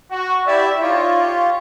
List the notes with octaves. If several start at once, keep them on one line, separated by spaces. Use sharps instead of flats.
F#4
E4 G4 D5 E5
D#4 F4 C#5 D5
G4 C#5